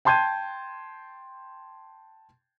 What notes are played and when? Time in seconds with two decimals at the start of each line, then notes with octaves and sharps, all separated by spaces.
0.05 G5 A5 C6 G6 G#6 D#7